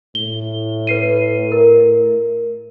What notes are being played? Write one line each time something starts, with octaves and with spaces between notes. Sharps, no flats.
A2 G7
B4 C7 D#7
A#4